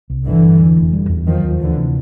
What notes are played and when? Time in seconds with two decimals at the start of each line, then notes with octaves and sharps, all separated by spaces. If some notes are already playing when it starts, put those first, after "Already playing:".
0.10 C2
0.26 G1 D3 E3
0.43 G2
0.60 E2
0.76 F1
0.93 G3
1.09 E2
1.26 D#3 F3 F#3
1.44 D#2
1.60 D2 D3 E3
1.77 C3